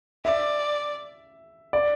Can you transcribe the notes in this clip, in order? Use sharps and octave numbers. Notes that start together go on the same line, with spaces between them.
D5 E5
D5